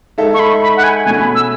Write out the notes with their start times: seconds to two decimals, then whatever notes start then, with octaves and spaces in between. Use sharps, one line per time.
0.18 G#3 D#4 A4 E5
0.34 C#6
0.40 B5
0.62 B5
0.77 F#5
0.84 G#5
1.05 B2 A3 C#4 G#5
1.20 B5
1.35 E6